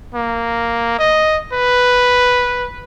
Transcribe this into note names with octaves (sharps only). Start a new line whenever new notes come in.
A#3
D#5
B4